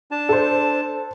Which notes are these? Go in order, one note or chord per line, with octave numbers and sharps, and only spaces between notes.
D4 A5
A4 C5